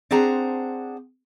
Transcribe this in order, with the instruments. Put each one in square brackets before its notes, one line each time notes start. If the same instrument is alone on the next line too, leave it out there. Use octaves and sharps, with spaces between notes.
[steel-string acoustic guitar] C4 D4 G#4 C5 F#5 A#5